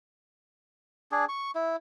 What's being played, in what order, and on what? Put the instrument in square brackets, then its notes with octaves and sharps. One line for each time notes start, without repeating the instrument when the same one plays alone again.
[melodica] D4 G#4
C#6
E4